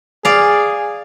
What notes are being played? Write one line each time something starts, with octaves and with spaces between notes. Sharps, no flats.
G#4 D5 F5